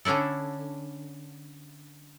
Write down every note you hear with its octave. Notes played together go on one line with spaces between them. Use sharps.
D3 C#4 D4 E4 A4